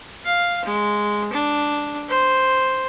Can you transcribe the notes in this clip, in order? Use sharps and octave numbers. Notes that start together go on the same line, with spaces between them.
F5
G#3
D4
C5